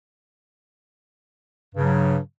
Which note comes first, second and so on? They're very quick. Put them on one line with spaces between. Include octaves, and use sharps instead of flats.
G2 C#3 F#3